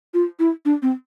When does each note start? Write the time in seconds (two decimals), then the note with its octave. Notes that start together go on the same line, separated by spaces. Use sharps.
0.14 F4
0.39 E4
0.65 D4
0.82 C4